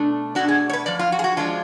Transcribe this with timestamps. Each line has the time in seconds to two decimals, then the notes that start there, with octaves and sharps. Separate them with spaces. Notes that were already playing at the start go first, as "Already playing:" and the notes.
Already playing: B2 A3 D4
0.35 B2 A3 D4 F#4
0.48 G#4
0.70 C#5
0.73 B4
0.86 F#2 F3 D5
0.99 F4
1.12 F#4
1.19 G#4
1.24 F#4
1.37 F3 G#3 D4 F4